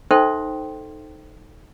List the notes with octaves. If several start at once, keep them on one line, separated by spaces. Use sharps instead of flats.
D#4 A4 C5 E5 G5 C6